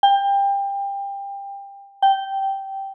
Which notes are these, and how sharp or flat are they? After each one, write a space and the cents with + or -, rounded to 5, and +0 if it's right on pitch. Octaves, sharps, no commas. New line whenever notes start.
G5 +25
G5 -10